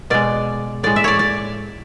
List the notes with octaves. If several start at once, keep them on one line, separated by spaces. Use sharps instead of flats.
B2 G#3 D5
A2 G#3 D5
E5
C#5 D5
D5